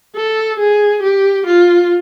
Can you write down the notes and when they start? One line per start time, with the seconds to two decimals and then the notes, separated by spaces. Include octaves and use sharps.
0.16 A4
0.59 G#4
1.02 G4
1.47 F4